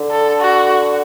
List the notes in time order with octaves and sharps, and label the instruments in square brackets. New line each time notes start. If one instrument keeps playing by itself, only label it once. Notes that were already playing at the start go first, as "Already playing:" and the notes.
Already playing: [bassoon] D3
[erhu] A4
F#4